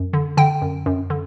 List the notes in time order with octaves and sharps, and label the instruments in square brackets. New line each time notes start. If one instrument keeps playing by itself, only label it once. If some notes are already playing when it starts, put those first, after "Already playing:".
Already playing: [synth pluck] F#2
D3
D3 G5
F#2
F#2
D3